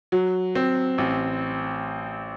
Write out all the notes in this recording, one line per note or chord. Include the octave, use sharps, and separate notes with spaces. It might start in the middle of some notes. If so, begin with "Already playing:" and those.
F#3
C4
A1